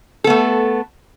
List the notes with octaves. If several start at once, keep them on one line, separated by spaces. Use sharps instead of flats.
A3 B3 A4